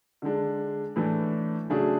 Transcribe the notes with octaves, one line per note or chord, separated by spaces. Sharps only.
D3 G#3 D4
A2 E3 A3 D4
C#3 F#3 A3 D4 G#4